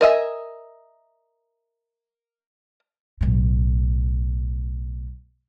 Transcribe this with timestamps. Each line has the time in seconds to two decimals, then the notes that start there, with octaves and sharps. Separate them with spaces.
0.01 A#4 D#5 E5 G#5
3.21 B1 A2